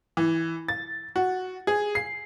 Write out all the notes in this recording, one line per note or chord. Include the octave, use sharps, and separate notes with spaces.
E3
A6
F#4
G#4
C7